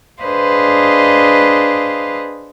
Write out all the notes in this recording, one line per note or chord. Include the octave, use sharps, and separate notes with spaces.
D4 G#4 B4 C5 D#5 F5